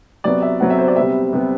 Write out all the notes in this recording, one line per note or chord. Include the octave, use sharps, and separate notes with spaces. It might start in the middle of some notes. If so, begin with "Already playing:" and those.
C3 F#3 B3 D5
E5
C3 F#3 B3 F#5
E5
C5
D5
C3 G3 B3 E5
C3 G3 B3